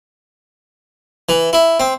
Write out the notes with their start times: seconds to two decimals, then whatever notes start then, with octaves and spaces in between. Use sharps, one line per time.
1.29 E3
1.53 E4
1.80 C4